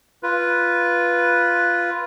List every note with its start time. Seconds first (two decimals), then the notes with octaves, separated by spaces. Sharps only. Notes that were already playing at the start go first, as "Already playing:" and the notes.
0.23 F4 B4